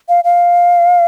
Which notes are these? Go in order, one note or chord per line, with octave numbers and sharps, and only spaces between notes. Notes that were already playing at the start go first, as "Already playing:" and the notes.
F5
F5